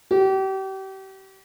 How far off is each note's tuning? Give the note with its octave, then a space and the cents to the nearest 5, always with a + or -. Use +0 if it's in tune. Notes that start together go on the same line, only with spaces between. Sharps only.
G4 -35